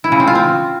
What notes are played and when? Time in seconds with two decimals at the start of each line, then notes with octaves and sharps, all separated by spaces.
0.04 E4
0.12 C#3
0.20 C4
0.27 F4
0.35 C4